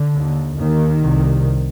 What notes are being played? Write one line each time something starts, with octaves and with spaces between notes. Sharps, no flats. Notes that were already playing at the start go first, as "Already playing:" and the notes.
Already playing: D3
D#2
D#2 D#3
C2 C3